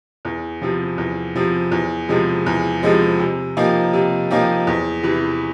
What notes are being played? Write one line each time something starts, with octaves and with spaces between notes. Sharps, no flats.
E2
C3 F3
E2
C3 F3
E2
C3 F3 G#3
E2
C3 F3 G#3
C3
F3 A#3 D#4 G4
C3
F3 A#3 D#4 G4
E2
C3 E3